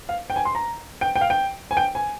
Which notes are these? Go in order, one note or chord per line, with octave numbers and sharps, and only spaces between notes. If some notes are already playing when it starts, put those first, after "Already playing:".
F5
G5
G#5
C6
A#5
G5
G5
F5
G5
G#5
G5
G#5